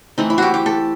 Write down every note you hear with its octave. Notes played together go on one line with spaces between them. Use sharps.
E3 A3 C4 D#4
E4
F#4 G4
G4
A4